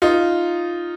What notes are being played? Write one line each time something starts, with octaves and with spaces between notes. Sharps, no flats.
D#4 F4